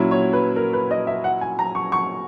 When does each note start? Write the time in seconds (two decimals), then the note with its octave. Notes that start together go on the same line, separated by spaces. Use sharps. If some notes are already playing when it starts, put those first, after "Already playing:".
Already playing: A#2 F#3 C#4 E4
0.11 C#5
0.33 B4
0.56 A#4
0.73 B4
0.91 D#5
1.07 E5
1.24 F#5
1.41 G#5
1.59 A#5
1.75 C#6
1.92 C#6